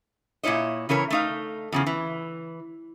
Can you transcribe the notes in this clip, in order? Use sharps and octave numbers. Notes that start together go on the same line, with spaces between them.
A#2 C#3 E4 C#5 D#5
C#3 E3 A#4 C#5
A3 D#4 F5
E2 C#3 F3
E3